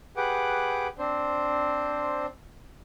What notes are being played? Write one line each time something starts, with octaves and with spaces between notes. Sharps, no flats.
G4 G#4 B4 F#5 D6
C4 D4 C5